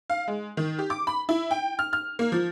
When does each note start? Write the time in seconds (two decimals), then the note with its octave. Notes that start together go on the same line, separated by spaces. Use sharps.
0.10 F5
0.28 G#3
0.57 D#3
0.79 G4
0.90 D6
1.07 B5
1.29 E4
1.51 G5
1.79 F6
1.93 F6
2.19 A#3
2.32 F3